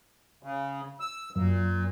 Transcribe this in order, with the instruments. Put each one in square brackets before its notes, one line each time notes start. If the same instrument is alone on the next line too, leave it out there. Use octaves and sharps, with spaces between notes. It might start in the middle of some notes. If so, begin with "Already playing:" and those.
[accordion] C#3
E6
[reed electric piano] F#2 [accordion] A#2